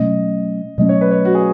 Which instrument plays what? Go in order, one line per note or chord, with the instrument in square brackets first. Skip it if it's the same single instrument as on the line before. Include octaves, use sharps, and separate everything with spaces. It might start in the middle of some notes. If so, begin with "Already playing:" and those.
Already playing: [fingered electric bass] B2 F#3 A3 C#4 [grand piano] D#5
[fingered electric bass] B2 F#3 A3 C#4 [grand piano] D#5
[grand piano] C#5
B4
C#5
F#4
G#4